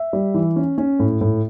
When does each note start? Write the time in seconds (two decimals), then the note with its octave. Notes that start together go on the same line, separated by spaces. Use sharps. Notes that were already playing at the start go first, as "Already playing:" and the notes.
Already playing: E5
0.13 G3
0.34 E3
0.56 C#4
0.78 C#4
1.00 A2
1.21 A2